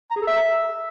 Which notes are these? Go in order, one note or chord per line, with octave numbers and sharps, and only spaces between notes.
A#5
G#4
A4
E5